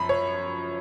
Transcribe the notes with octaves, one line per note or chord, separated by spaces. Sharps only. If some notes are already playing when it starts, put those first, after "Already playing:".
Already playing: F#2 F3 B5
C#5